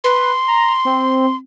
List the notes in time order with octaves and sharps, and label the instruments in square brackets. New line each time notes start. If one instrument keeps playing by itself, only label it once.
[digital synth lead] B4 [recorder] C6
[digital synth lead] A#5
C4